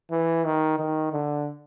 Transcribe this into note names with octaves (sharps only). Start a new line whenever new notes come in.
E3
D#3
D#3
D3